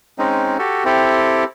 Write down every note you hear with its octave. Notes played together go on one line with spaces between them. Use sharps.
G#3 C4 C#4 D#4
F#4 G4 A4
C4 E4 G4 A4